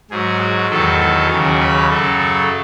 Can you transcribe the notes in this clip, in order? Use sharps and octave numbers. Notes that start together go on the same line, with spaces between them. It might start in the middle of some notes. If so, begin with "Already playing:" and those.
G#2 F#3 G#4
F#4
E2 D#3 F#3 A4
A4
D#2 C#3 F#3 G#4
B4
F#2 C#3 F#3 A4